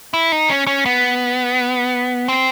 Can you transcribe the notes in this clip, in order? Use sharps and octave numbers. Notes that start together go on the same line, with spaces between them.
E4
D#4
C#4
C#4
B3
C4